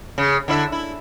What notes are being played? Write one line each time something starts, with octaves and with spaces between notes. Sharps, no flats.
C#3
D3 E4 E5
E4